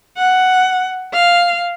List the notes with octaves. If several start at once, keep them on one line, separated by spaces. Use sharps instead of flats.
F#5
F5